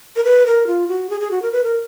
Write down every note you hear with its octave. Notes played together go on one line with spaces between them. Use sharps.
A#4
B4
A#4
F4
F#4
G#4
G#4
F#4
A#4
B4
A#4